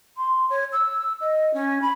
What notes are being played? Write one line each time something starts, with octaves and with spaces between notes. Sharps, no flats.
C6
C#5
E6
D#5
C#4
B5